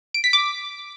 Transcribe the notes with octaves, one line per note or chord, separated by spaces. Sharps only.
D7
B6
D6